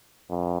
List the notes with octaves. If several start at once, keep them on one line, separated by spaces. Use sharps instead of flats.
F2